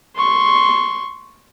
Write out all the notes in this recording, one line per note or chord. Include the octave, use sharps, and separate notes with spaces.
C6 C#6